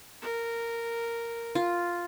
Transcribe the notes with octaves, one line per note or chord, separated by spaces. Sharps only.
A#4
F4